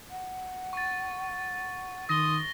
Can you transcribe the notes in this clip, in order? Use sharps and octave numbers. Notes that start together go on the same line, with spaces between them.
F#5
C#6 A6
D#3 C6 D#6 A#6 G7